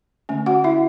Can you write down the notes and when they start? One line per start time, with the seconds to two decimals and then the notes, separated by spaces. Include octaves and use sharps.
0.29 D3 A3 C#4
0.46 F#4 F#5
0.64 E4 E5